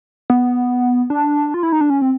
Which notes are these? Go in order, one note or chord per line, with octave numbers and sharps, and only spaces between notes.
B3
D4
F4
E4
D#4
D4
C#4
C4